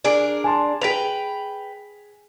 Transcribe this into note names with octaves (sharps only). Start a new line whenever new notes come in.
D4 G#4 A#4
G#5 A5 C6
G#4 B4 G5 B6 F7